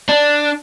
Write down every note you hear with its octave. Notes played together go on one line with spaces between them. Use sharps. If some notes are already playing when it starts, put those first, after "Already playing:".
D4